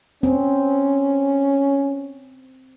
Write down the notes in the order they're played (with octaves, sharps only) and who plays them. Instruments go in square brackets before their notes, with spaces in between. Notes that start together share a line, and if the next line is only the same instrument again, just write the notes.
[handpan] C4 [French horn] C#4